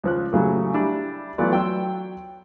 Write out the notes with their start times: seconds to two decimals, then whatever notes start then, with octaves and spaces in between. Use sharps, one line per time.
0.03 C#2 F3 F#6
0.33 A2 C#3 F#3 G3
0.74 G3 D4 E4
1.38 E3 F#3 A3 B3 F4 D5
1.52 F#3 G5 C6 E6